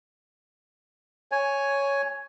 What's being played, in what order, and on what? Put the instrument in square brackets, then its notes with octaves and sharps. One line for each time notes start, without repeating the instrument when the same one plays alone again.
[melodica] C#5 G#5